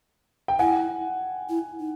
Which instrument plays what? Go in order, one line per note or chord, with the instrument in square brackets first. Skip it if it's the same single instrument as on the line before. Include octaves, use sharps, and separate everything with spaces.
[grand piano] G5
[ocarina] E4 [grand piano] F#5 G#5
[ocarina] E4
D#4